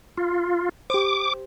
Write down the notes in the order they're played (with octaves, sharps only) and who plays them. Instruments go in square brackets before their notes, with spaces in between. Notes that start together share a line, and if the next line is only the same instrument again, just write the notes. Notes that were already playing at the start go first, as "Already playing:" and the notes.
[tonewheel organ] F4
[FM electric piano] G4 C5 [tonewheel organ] D6